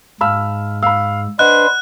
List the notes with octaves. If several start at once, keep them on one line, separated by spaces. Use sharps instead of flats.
G#2 F5 A5 B5 E6 F6
F5 B5 E6
D4 B4 C5 D#5 F#5 F#6